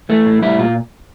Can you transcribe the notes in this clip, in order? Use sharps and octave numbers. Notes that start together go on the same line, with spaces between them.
E3 A3
A2
G3 E4
A#2 F4